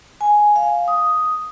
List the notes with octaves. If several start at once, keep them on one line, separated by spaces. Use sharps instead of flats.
G#5
F5
D#6